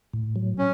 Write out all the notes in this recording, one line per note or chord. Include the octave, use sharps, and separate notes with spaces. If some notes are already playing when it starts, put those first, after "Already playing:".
A2
F#3
C#4